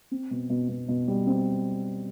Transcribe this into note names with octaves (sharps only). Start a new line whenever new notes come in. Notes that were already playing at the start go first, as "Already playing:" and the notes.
C4
B2
B2
B2
B2
G3
C4